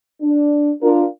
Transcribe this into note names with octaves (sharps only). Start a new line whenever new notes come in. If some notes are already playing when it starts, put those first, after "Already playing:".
D4
D4 F4 A#4